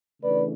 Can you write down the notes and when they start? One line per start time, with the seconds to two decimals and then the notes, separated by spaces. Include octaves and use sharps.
0.22 C#3 E3 A3 D4 B4 D5